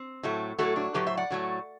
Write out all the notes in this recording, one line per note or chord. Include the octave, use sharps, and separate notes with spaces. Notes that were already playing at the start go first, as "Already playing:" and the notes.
Already playing: C4
A2 F#3 A3
A2 F#3 A3 F#4 A4
D4 F#4
A2 F#3 A3 G4 B4
C5 E5
D5 F#5
A2 F#3 A3